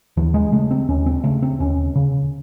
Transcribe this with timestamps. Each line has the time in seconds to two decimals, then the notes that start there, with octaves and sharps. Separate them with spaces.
0.17 D#2 E3
0.34 G#3
0.52 C#3 A3
0.71 C4
0.88 D#2 C#4
1.06 C4
1.24 C#3 A3
1.42 C4
1.60 D#2 C#4
1.95 C#3